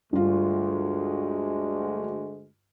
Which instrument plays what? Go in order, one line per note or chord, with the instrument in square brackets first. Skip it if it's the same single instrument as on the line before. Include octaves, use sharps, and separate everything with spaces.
[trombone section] D2 G#3 [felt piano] G2 F4